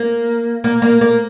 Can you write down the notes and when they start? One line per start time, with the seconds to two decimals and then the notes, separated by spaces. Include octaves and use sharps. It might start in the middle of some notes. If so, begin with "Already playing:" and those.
Already playing: A#3
0.64 A#3
0.82 A#3
1.01 A#3